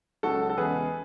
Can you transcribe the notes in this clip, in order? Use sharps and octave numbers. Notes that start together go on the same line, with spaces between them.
C#2 C#3 F#3 F#4 A4
A4
E2 C#3 G#3 G#4 B4